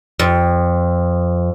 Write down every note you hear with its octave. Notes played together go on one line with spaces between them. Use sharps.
F2